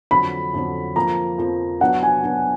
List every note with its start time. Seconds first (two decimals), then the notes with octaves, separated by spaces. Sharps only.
0.11 F2 D3 F#3 B5
0.54 F2 D3 F#3
0.96 F2 F3 A#3 A#5
1.38 F2 F3 A#3
1.81 F#3 B3 D4 F#5
2.03 G#5
2.23 F#3 B3 D4